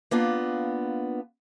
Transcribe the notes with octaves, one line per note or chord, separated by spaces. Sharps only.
A#3 B3 D4 F4